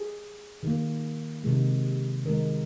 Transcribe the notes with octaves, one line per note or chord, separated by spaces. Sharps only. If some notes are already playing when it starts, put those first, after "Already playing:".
Already playing: G#4
D#3 A#3
C3 D#3 G#3
D#3 G#3 A#4